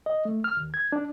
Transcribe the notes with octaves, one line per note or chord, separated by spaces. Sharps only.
D#5
A3
F6
D#2
G#6
D4